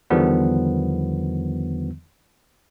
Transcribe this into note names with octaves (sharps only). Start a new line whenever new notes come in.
E2 D3 D#3 F3 G3 B3